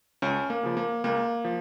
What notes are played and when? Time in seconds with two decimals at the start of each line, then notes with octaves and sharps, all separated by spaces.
0.22 C#2 C#4
0.50 A#3
0.63 C#3 F3
0.77 A#3
1.04 C#2 A#3
1.45 F3